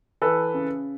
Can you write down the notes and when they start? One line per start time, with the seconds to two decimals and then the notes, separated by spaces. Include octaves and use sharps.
0.22 E3 A4 B4
0.54 C#3